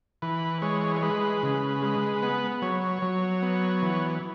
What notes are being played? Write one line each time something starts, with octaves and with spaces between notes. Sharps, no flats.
E3 B4
G#3 C#5
C#5
G#3 B4
C#3
G#3
B3
F#3 C#5
F#3
B3
E3